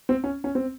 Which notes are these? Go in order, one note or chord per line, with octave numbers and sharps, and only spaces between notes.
C4
C#4
C#4
C4